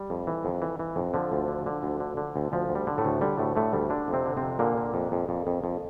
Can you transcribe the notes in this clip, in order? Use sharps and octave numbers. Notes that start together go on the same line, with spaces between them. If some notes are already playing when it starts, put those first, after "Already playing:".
Already playing: G3
F2
E3
F2
E3
E3
F2
D3 F3
D2
D3
D3
D2
D3
D3
D2
D2 F3
D2
G3
D3
A2 A3
D2
D3 G3
D2 A2 A3
A2 D3 A3
D2 G3
D3 D4
F2
C3 C4
D3
C3 C4
F2
A#2 D3 A#3
D3
F2
F2
F2
F2
F2